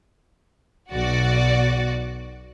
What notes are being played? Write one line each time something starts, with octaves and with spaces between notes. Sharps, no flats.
B1 F#4 D5